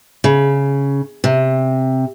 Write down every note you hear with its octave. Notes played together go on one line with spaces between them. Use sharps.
C#3
C3